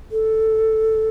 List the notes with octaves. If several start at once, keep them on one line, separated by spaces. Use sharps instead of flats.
A4